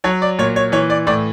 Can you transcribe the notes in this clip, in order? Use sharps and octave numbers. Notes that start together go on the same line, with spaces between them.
F#3 C#5
D5
A#2 C#5
C#5
E3 C#5
D5
A2 D5